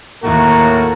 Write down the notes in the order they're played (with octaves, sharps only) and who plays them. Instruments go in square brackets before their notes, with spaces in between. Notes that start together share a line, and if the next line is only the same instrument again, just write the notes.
[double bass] D#2 A#3 [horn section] A2 A3 F#4 [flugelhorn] A#4